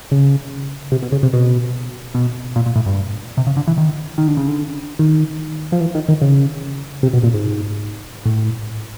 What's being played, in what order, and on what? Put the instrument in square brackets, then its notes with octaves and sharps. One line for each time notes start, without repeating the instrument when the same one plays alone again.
[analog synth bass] C#3
C3
B2
C#3
C3
B2
B2
A#2
A#2
A2
G2
C3
C#3
D3
E3
D#3
D#3
D3
C#3
D3
D#3
F3
E3
D#3
D#3
C#3
C3
B2
A#2
G#2
A2